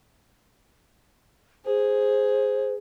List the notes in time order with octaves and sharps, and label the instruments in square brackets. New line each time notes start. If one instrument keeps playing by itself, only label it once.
[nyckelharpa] G#4 [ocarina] C5